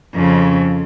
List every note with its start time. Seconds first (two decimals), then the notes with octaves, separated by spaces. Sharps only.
0.14 F2 C#3